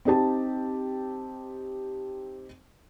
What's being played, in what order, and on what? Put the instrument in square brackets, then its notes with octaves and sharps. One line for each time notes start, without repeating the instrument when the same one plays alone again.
[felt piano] C4 D#4 G4 A5